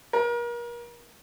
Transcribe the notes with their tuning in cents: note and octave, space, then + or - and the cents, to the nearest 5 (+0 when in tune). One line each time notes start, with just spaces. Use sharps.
A#4 +35